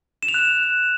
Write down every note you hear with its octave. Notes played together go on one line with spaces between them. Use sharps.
E7
F7
F#6